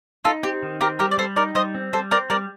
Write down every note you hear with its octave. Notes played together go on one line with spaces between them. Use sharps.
D#4 F4 A4
C4 G4
D#3
C4 G4 A#4
G3 G4 A#4
D5
G3 A4 C5
D#4 A#4 D5
G3 C5 D#5
C4
G3 A4 C5
C4 A#4 D5
G3 A#4 D5